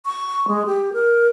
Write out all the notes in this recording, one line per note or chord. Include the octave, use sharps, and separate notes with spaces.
C#6
G#3
G4
A#4